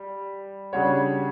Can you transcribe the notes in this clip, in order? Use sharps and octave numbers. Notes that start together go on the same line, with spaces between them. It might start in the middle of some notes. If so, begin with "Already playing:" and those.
Already playing: G3
C#3 G3 D4 F#4 C#5